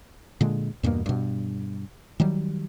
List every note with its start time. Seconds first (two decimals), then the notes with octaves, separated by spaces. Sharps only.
0.41 A#2 D3 G#3
0.83 E2 G2 B2 A#3
1.06 G2 B2
2.20 D#3 F#3 G3